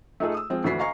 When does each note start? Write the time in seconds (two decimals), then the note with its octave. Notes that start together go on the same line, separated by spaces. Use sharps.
0.20 A3 D#4 F4 G#4 A4
0.34 D#6 E6
0.50 F3 G#3 C4 F4
0.64 D2 E3 D4 F#4 B6 C7
0.79 D#5 F5 G#5 A#5 C#6 C7